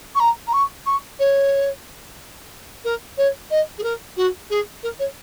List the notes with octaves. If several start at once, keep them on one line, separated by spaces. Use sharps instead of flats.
C#6
A#5
A#5
C#6
C#6
C#5
A#4
C#5
D#5
G#4
A#4
F#4
G#4
A#4
C#5